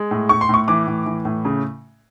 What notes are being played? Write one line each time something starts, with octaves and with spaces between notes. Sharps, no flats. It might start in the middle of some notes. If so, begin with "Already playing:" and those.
Already playing: G#3
A2
A2 C#6
C6
A2 C#6
E3 D6
A2
E3
A2
C#3